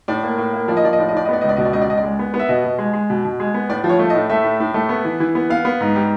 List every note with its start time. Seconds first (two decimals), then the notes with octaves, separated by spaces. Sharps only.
0.08 A2 D5
0.23 A#3
0.38 A2
0.54 A#3
0.68 F3 D5
0.77 D#5
0.84 F3 D5
0.93 D#5
0.98 A2 D5
1.09 D#5
1.13 A2 D5
1.25 D#5
1.29 B3 D5
1.41 C#2 D#5
1.49 D5
1.56 B2 D#5
1.65 D5
1.73 C#2 D#5
1.82 D5
1.88 C#2 D#5
1.98 D5
2.03 G#3
2.19 B3
2.34 B3
2.39 E5
2.49 B2 D#5
2.64 B2
2.78 G#3
2.93 G#3
3.10 B2
3.25 B2
3.40 G#3
3.54 B3
3.69 A2 D5
3.84 F3
3.89 C#5
3.99 A3
4.10 D#5
4.15 A2
4.29 A3 E5
4.44 A2
4.60 A2
4.74 A3
4.89 B3
5.05 E3
5.20 E3
5.35 B3
5.50 B3 F5
5.65 B3
5.80 G#2
5.95 G3